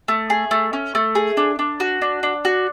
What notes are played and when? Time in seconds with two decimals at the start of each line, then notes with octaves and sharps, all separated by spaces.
0.08 A3
0.30 G#4
0.51 A3
0.73 C#4
0.95 A3
1.15 G#4
1.37 D4
1.59 D4
1.80 F#4
2.02 D4
2.23 D4
2.45 F#4